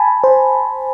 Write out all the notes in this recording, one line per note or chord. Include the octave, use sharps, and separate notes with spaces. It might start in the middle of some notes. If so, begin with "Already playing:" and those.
Already playing: G#5 A5 B5
C5